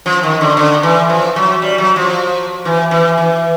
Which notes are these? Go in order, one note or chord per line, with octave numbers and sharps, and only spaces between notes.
F3
D#3
D3
D3
E3
F3
F#3
G3
F#3
F3
E3
E3
E3